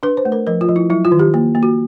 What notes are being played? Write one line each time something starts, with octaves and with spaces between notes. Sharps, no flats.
D4 B4
C5
A3
A#4
F3 A#4
F4
F3
E4
F#3 E4
F4
D#3
G4
A#3
A#3
F#4